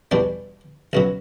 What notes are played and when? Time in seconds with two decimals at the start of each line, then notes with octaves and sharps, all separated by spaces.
0.11 E2 B2 G3 D4
0.93 C#2 B2 F#3